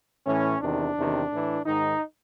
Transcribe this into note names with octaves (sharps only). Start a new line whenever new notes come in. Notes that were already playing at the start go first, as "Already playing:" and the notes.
A2 E3 C#4
E2 C3 D#3 D4
E2 C3 D#3
A2 E3
G#2 D#3 D#4